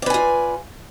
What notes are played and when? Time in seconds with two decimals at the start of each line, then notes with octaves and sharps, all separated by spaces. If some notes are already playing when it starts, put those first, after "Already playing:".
0.02 D5
0.06 B4
0.10 G#5
0.14 F4